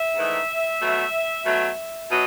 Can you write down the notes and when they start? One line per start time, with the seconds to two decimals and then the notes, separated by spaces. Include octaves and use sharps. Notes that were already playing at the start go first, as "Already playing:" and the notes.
Already playing: E5
0.15 G#2 E3 A3 D#4
0.81 B2 F#3 A3
1.45 B2 F#3 A3
2.10 B2 F#3 D#5